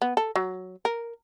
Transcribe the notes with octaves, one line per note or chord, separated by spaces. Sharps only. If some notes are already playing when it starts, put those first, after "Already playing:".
B3
A4
F#3
A#4